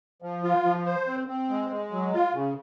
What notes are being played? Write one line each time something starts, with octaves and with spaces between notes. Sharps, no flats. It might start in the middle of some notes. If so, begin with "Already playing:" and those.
F3
F4
F3
C5
C4
C4
G#3
G#3
F#3
F4
C#3